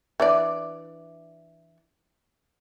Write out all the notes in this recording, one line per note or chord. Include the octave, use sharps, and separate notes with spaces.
E3 D4 D5